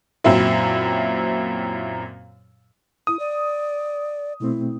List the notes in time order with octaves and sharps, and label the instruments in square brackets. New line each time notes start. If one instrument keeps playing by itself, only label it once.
[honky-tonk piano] F#2 A#2 F#3 C4 E4
[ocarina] E4 [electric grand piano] D#6
[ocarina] D5
[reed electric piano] B2 A3 C4 [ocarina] E4